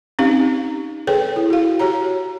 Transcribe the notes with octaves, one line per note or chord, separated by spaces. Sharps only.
C4 C#4 D#4 G4 F5
G#4 A4 B4 C#5 G5
E4
F#4 F5
F#4 G4 C#5 A#5